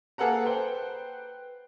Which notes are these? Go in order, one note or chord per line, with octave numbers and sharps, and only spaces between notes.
A#3 G#4 A4 B4 F#5 A#5
B4 C5 G5